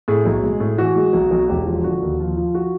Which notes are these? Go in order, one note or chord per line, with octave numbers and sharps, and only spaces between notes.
A2 G#4
B1
G#3
A2
E3 F#4
G#3
B1
B1
E1 G4
F3
D3 F#4
D#2
F3 F4
F3
F#4